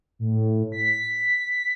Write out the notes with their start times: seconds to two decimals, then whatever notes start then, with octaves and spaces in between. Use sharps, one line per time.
0.19 A2
0.72 B6